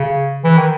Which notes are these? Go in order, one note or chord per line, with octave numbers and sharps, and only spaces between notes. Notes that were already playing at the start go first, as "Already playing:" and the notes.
Already playing: C#3
E3
D#3